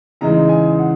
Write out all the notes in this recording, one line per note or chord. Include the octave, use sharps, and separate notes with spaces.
E2 C#3 E3 G#3 D#4 A#5
G#5
F#5